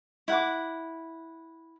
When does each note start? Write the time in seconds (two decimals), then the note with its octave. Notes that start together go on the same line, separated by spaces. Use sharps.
0.28 E4 F#5 A5 D6